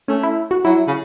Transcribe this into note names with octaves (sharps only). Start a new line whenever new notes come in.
A3 C#4
E4
F#4
F#3 E4
C#3